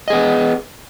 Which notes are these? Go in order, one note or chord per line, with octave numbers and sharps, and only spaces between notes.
B3 G#4 D#5